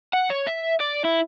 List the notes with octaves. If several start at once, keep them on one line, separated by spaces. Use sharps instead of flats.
F#5
C#5
E5
D5
E4